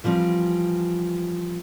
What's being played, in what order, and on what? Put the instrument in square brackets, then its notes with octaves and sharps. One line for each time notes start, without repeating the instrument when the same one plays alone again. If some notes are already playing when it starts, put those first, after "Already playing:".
[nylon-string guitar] E3 F3 G3 C4